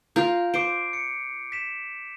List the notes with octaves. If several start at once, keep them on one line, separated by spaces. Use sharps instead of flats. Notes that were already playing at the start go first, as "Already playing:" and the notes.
F4 A#4 G6
C5 D6 C7 D7
C#7
B6 E7